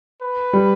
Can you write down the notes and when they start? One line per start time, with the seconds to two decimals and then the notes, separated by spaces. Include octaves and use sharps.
0.22 B4
0.53 G3